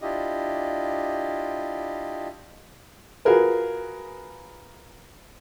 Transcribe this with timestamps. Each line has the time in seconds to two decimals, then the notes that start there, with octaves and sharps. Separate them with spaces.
0.02 D4 E4 F4 G4 D#5
3.25 F4 F#4 G#4 A#4 B4